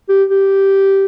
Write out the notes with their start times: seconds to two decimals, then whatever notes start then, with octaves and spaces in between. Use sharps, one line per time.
0.09 G4
0.30 G4